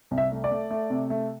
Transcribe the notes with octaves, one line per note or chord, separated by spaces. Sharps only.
C2
E5
A3
D5
A3
A3
C3
A3